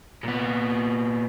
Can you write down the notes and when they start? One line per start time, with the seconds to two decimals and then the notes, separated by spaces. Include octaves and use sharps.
0.23 A#2 B3